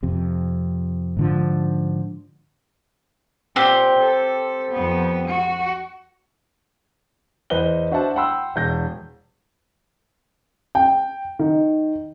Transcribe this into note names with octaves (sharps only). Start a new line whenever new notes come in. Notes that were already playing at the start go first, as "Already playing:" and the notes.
F2 C3
G#2 D3 F3
A#2 C4 G4
A4
F2 B3
F#4
E2 B4 C5 D#5 G7
D4 F#4 C5 E5 F#5 A5
F#5 G5 B5 C6 E6
E1 G6 A#6
G5
D#3